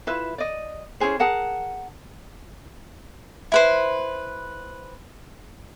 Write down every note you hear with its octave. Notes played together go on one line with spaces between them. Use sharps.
E4 F4 B4 E5
D5 D#5
C#4 E4 G#4 C5
G#4 A#4 F#5 A5
E4 B4 C5